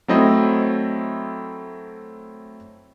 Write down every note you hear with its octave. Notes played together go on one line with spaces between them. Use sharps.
F#3 A3 C4 E4 D#5